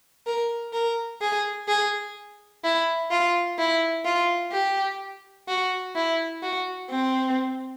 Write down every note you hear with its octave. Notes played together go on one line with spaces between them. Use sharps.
A#4
A#4
G#4
G#4
E4
F4
E4
F4
G4
F#4
E4
F#4
C4